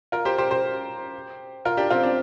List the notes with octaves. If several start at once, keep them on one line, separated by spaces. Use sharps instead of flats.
F4 A#4
G4 C5
G4 C5
G4 C5
F4 A#4
D4 G4
C4 F4
D4